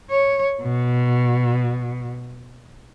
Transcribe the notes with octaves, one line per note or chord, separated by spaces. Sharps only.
C#5
B2